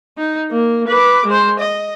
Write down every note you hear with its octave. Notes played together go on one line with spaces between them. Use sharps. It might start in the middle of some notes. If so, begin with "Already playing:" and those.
D#4
A#3
B4 D6
G#3 C5
D#5